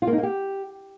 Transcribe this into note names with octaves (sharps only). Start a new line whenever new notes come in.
F4
A#3
D#4
A#3
G4